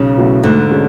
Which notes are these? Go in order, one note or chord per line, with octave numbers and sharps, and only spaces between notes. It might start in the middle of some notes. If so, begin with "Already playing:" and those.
Already playing: B1 C#3
B2 F#3 A3 E4
D2 G#2 D3
G#3 C#4